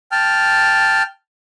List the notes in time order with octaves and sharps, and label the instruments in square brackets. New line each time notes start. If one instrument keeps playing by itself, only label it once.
[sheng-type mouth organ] G5 A5 F6